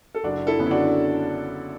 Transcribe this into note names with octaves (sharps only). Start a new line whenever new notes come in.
A4
F#1 D4 F#4
E4 A4
F#2 D3 B3
E4
D4 F#4